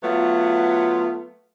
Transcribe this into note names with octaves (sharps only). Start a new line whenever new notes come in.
F#3 A3 B3 F4